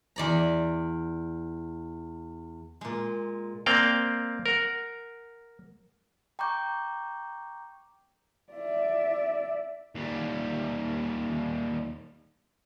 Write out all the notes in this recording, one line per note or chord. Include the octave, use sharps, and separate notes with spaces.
E2 D5 A#5
A#2 G#3
A#3 C4 D5 F5 G5
A#4 F#5
G5 A#5 C#6 D6 G6
D5 E5
D#2 G3